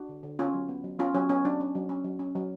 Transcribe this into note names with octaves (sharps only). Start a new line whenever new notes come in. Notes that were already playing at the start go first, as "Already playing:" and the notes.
Already playing: D4 F#4
D3
D3
B3 C#4 F4
F#3
B3
F#3
B3 C#4 F4
F#3 C#4
B3 C#4
F#3 D4
C#4
F#3
C#4
F#3
C#4
F#3